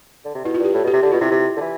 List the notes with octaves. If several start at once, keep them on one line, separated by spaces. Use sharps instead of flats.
D3
C3
B2 E4
F4
G2 G4
A2 A4
B2 G4
C3
D3 G4
B2 F4
C3 E4
C3
D3
E3